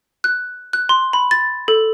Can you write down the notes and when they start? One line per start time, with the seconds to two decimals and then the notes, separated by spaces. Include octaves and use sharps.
0.24 F#6
0.73 F#6
0.89 C6
1.13 B5
1.31 A6
1.68 A4